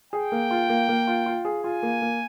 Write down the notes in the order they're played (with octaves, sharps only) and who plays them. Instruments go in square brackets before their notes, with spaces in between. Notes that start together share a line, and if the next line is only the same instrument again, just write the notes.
[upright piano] G#4 [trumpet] G5
[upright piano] A#3
F4
A#3
A#3
F4
F4
G#4
[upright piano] F4 [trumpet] G#5
[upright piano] A#3
A#3